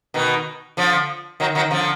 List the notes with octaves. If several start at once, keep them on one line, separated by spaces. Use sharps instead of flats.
B2 D#3
D3 F3
D#3 F#3
D#3 F#3
D3 F3